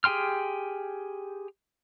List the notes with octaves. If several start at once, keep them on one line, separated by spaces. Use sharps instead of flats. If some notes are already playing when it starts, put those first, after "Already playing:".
G4 G#4 G5 C6 F6